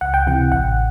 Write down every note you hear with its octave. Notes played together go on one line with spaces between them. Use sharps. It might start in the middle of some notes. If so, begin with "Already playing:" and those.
C#2 F#5
G5
C3 E3 F#5
A1 F#5